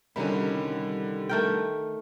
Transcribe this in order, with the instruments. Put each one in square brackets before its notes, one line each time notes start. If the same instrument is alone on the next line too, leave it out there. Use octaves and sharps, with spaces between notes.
[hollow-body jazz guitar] C2 C#4 [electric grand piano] D3 G3 B5 [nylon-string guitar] D#3 D#4 F#4
[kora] A3 A#4 G5